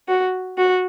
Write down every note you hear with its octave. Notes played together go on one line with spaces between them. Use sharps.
F#4
F#4